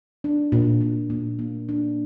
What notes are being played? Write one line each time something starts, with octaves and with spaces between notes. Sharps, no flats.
D4
A#2
A#2
A#2
A#3
D4